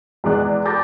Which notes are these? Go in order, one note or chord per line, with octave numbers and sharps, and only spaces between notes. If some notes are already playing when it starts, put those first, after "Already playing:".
E2 G#3 D5 F#6
A5 B5 D6 G6 A6 A#6